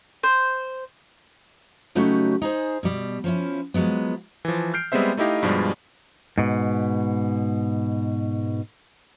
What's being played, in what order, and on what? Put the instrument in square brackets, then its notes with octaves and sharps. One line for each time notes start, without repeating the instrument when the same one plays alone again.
[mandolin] C5
[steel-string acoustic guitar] C#3 F#3 A3 D#4 F#4 G4
D#4 G#4 C5
B2 G3
F3 C#4 E4
F3 F#3 G#3 B3
[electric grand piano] E3 F3
F6 G6 C7 D7
G3 G#3 B3 C4 C5 E5
A3 D#4 E4 G4 D#5 F5
G2 B2 F3 G3 G#3
[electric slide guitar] G#2 B2